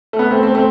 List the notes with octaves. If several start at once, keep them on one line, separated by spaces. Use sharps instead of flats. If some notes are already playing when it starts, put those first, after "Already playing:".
A3
B3
A3 C4
A3 C4
A3 C4